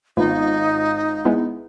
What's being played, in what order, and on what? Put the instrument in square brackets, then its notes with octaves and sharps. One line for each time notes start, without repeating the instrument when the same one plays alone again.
[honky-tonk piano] G#1 F4 [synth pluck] B3 [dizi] D#4
[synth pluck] G#3 B3 E4